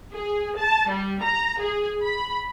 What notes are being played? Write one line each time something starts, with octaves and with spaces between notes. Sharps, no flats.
G#4
A5
G3
A#5
G#4
B5